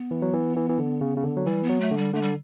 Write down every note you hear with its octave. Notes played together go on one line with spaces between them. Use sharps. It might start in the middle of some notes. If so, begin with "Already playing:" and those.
Already playing: B3
E3
F#3
E3
E3
E3
D3
C#3
C#3
D3
F#3
E3 G3
B3
F#3
A3
D3
G3
D3 A3
G3